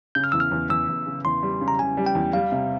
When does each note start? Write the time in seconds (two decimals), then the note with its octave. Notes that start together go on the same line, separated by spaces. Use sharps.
0.15 C#3 G6
0.24 F6
0.32 E2 E6
0.40 F6
0.51 E2
0.70 E2 E6
0.88 E2
1.07 C#3
1.25 E2 C6
1.43 G3
1.61 C#3
1.68 A#5
1.79 C#3 G#5
1.97 G3
2.06 G5
2.15 E2
2.33 G3 F5
2.52 C3